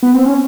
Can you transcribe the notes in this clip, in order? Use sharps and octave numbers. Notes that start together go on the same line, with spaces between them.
B3
C4
C#4